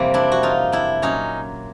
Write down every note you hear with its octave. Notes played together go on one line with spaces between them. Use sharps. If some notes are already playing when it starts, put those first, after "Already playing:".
Already playing: F2 C3 E3 G3 A#3 C4
D4 E4
F#4
D#4 F4
D4 E4
A#2 F#3 C#4 D#4